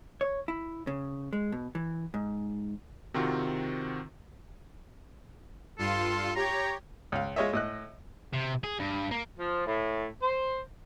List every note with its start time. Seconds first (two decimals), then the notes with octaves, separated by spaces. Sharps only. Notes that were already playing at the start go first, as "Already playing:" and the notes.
0.21 C#5
0.48 E4
0.87 C#3
1.33 G#3
1.52 B2
1.75 E3
2.14 G#2
3.14 C3 D#3 C4 F4 F#4
5.79 G2 F4 A4 C6
6.36 G4 C#5 A#5
7.12 C#2 F5
7.36 G#3 F4 C#5 D#5 E5
7.53 A2 D#5 F#6
8.33 C3
8.64 G#4
8.79 G2
9.11 A#3
9.39 F3
9.67 A2
10.22 C5